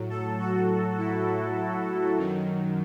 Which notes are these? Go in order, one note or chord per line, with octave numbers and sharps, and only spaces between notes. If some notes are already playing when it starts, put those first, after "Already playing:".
Already playing: A2 F#3
A4
F#4
E4
F#2 D#3 F#3